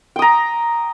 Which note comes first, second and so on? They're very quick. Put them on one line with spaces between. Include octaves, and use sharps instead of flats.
G5 D#6 A#5